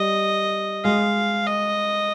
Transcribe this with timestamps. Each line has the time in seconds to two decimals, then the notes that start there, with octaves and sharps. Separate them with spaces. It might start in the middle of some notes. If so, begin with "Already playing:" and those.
Already playing: G3 D#5
0.84 G#3 F5
1.46 D#5